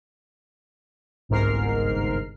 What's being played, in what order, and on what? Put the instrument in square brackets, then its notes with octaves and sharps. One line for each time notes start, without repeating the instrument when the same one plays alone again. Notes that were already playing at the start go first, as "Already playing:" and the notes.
[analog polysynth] G1 C2 G#2 A#4 F6 C7